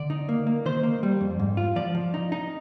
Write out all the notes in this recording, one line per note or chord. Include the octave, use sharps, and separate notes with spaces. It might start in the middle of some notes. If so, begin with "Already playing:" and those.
Already playing: D3 D5
D#4
A#3
A#3
D#3 C5
A#3
G3
F2
G#2
F4
F3 D5
F3
D#4
D#4